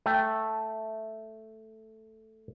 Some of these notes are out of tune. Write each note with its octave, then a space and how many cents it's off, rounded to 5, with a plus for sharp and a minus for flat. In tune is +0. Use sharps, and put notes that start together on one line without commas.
A3 +0 G5 +0